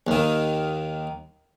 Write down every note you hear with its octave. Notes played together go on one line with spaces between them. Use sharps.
D#2 D#3